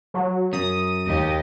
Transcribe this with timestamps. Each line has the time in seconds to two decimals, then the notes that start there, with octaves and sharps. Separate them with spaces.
0.14 F#3
0.53 F#2 D#6
1.07 D#2 G4 D#5